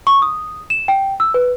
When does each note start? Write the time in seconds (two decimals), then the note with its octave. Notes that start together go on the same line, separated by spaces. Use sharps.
0.07 C#6
0.22 D#6
0.70 E7
0.88 G5
1.20 E6
1.34 B4